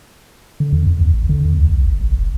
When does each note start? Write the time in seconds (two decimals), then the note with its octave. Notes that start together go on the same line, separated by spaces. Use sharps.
0.60 D3
0.73 E2
0.87 F2
1.01 D#2
1.14 A1
1.29 D3
1.45 E2
1.57 D2
1.71 C2
1.85 G1
2.01 A#1
2.18 F1